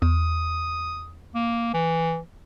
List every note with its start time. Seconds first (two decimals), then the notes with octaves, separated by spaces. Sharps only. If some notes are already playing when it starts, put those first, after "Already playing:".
0.02 E2 D#6
1.35 A#3
1.74 E3